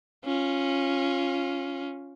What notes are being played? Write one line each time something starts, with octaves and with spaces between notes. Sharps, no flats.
C#4 F4